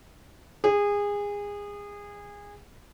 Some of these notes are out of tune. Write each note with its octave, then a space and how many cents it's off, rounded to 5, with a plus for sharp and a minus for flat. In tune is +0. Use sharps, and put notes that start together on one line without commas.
G#4 -25